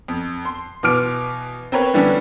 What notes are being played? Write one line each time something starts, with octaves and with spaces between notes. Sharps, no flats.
F2
C6
B2 E3 D6 F6 D7
C4 A#4 B4 C#5
D3 E3 G3 B3 C#4 D4